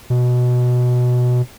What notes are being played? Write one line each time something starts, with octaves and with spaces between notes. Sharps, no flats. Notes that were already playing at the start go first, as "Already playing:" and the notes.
B2